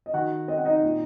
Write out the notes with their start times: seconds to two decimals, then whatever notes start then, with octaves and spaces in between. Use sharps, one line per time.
0.06 D#5
0.13 D#3 F#4 F#5
0.48 C4 D#5
0.57 F#5
0.65 D#4 D#5
0.83 A#2